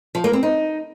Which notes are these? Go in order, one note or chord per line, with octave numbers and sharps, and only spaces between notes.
F3
A#3
C4
D#4